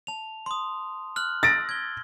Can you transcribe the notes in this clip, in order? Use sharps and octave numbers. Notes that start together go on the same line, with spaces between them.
A5 F7
C6 D#6
F6 F#6 F#7
E6 A6 A#6 D7
G#6 G7